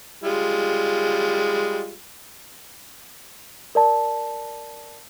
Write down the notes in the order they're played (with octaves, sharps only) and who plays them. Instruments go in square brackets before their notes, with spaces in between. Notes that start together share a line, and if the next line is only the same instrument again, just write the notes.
[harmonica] G3 G#3 F4
[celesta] A#4 D5 A5